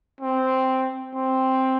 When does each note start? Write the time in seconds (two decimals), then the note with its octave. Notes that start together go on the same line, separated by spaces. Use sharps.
0.21 C4
1.15 C4